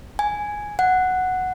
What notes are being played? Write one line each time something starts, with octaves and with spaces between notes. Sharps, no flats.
G#5
F#5